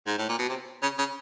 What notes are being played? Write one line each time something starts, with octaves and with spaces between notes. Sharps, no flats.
G#2
A2
A#2
B2
C3
C#3
C#3